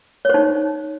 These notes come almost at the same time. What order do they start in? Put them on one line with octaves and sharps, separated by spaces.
C#5 C5 D#4